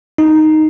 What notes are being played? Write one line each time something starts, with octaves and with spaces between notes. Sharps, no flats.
D#4